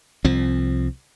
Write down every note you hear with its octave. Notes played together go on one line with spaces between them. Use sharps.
C2 F3 C4